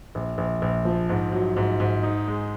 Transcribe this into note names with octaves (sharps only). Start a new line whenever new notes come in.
A#1
A#1
A#1
F3
G#2
F#3
G#2
G#2
D#4
G#3